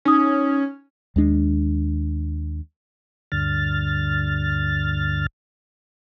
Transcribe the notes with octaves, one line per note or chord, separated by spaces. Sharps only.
C#4 D#4 D#6
D#2 G#3 D4
D2 G2 D3 F6 A6